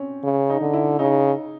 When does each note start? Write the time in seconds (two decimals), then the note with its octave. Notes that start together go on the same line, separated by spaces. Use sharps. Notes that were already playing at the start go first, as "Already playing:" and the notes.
Already playing: C4 C#4
0.24 C#3
0.50 D#4
0.61 D3
0.73 E4
0.99 C#3 D#4